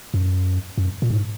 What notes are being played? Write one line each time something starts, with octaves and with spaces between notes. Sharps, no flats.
F#2
F#2
A#2
G#2